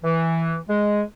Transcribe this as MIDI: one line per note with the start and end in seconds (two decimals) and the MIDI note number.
0.03 0.56 52
0.68 1.02 56